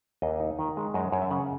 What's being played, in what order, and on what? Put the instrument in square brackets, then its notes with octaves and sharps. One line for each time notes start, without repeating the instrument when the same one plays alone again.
[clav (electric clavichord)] D#2 D#5
D#4
D#3
G#3
F#2 D#5
F#2 C#5
E5
C#3 F#5